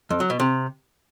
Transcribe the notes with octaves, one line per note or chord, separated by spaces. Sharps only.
F2
F#3
B2
C3